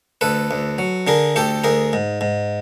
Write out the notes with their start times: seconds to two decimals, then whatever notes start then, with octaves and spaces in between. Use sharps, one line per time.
0.21 D2 A4 B4
0.51 D2
0.78 F#3
1.07 D3 G#4 A#4
1.36 D2 G4 A4
1.64 D2 G#4 A#4
1.93 G#2
2.21 G#2